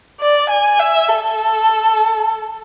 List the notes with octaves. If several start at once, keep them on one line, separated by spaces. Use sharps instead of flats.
D5
G#5
E5
A4